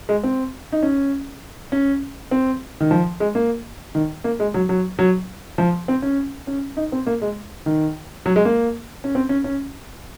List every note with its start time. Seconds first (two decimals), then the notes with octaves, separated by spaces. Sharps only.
0.09 G#3
0.23 C4
0.72 D#4
0.83 C#4
1.72 C#4
2.31 C4
2.80 D#3
2.91 F3
3.20 G#3
3.35 A#3
3.95 D#3
4.24 A#3
4.40 G#3
4.54 F#3
4.69 F#3
4.99 F#3
5.58 F3
5.88 C4
6.02 C#4
6.47 C#4
6.77 D#4
6.92 C4
7.07 A#3
7.22 G#3
7.66 D#3
8.26 F#3
8.36 G#3
8.45 A#3
9.04 C#4
9.15 C4
9.29 C#4
9.44 C#4